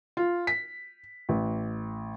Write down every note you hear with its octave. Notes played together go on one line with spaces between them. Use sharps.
F4
B6
A1